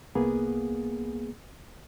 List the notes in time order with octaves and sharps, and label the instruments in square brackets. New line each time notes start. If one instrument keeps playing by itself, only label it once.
[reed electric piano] C2 A#3 B3 G#4